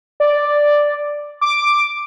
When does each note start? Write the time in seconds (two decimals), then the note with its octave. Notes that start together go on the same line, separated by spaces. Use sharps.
0.20 D5
1.41 D6